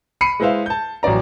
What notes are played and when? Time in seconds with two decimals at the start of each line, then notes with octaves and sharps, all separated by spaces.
0.21 B5 C7 C#7 D#7
0.40 G#3 E4 B4 C5 E5 F5
0.66 A5 G6
1.03 A1 F#3 C#4 D5 A#5